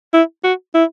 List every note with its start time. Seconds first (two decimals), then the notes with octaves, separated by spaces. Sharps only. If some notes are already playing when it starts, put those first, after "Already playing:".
0.13 E4
0.44 F#4
0.75 E4